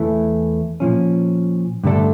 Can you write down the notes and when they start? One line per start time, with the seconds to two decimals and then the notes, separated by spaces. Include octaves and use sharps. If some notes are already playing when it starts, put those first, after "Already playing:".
Already playing: E2 E3 A3 E4
0.80 A#2 F3 C#4
1.84 G2 D3 A3 D4 A4